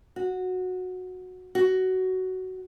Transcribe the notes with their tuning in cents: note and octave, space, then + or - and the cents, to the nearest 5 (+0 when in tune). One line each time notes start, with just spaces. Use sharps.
F#4 -10
F#4 +15